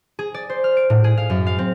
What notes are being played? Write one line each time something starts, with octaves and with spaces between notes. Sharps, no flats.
G#4
D5
C5
F6
D7
A2
G#4
F5
F#2
F5
C4